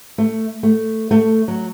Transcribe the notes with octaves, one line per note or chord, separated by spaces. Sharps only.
A3
A3
A3
F#3